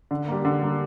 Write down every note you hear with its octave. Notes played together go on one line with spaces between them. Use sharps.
D3
G3 A#3
D3
G3 A#3